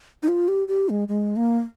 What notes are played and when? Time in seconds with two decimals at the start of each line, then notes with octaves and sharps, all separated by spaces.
0.23 D#4
0.28 F4
0.48 G4
0.68 G4
0.89 G#3
1.08 G#3
1.36 A#3